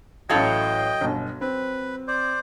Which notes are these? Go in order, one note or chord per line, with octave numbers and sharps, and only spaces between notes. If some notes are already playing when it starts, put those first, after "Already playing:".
A1 F#3 E4 A4 D#5 F5 G5 G#6
G1 B2
C4 B4
C5 D5